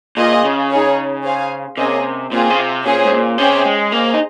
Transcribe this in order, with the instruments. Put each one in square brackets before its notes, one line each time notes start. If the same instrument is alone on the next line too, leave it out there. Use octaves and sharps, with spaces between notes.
[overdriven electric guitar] A#2 [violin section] F4 G#4 D#5
[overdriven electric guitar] C#3
[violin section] D#4 G#4 C#5
G#4 C5 F5 G#5
[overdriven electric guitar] C3 [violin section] A#3 C#4 G#4 D#5
[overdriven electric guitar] A#2 [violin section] C4 F4 G#4
[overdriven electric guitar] C#3
C3
[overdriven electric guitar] A#2 [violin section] C#4 G#4 C5
[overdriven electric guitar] G#2
A#2
[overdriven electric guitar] C3 [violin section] C#4 G#4 C5 G5
[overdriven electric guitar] G#3
[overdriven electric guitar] A#3 [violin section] G#4 C5 D#5
[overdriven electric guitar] D#4